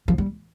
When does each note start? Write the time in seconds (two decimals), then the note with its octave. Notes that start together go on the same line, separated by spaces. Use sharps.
0.08 F3
0.18 G3